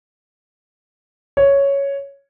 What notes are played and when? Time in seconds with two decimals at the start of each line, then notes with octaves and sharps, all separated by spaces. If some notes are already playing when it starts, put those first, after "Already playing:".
1.37 C#5